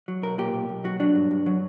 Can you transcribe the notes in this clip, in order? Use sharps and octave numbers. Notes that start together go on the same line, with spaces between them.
F#3
B1 A#4
A#2 G4
B1
B1
F#3 F#4
F#3 D4
G2
G2
F#3